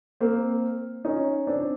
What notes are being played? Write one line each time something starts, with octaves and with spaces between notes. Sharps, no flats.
A#3 C4
C#4 D#4
C4 D4